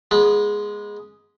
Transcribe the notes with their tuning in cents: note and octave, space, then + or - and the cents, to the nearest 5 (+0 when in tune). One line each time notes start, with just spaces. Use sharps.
G#3 +0 B3 -30